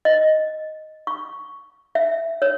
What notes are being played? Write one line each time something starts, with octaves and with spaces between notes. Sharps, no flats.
D#5
C#6
E5
C#5